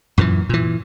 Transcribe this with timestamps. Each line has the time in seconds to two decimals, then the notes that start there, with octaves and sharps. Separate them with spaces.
0.18 F#2 A#2 D#3 E3
0.49 A#2 E3